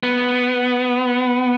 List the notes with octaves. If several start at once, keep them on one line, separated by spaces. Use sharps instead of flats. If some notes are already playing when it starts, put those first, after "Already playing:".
B3